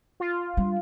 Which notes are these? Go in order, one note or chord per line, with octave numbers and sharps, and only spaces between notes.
F4
G3 D4